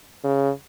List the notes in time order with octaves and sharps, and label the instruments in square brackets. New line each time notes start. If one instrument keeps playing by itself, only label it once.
[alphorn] C#3